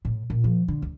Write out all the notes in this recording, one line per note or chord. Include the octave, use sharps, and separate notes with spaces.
A2
A#2
F3
D3
D2